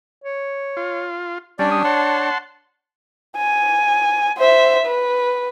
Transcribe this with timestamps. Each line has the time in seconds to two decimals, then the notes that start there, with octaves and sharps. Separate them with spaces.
0.24 C#5
0.77 F4
1.59 G3 C#4 D4 D5
1.72 D#6
1.85 C#5 F#5 A5 C6
3.37 G#5
4.38 C5 E5
4.86 B4